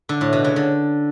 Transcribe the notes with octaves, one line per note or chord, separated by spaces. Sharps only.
D3
A2
B2
C#3
D3